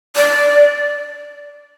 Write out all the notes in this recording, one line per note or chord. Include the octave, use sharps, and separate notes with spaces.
D5